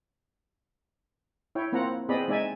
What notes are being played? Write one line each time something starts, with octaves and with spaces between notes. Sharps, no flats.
E4 C#5 G5
A#3 C4 F4 F#5 A#5
B3 C4 G#4 D5 D#5 B5
G#3 D#4 D5 E5 G#5